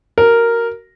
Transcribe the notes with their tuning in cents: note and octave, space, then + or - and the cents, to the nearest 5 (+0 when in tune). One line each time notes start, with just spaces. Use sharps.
F#4 +20 A#4 -5